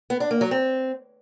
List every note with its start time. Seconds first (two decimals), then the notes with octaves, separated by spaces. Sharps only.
0.10 B3
0.20 D4
0.31 A#3
0.41 F#3
0.51 C4